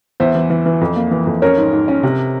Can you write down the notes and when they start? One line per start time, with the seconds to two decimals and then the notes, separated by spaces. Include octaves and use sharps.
0.20 E2 C5 E5
0.35 E3
0.50 E3
0.66 E3
0.81 F2
0.96 A#3
1.11 E3
1.27 F2
1.42 C#4 A#4 C#5
1.58 G#2
1.73 G#2
1.88 C#4
2.03 C3